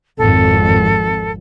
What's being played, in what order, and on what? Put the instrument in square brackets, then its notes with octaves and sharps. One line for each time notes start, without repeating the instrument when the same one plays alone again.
[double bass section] G#1 F2 [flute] A4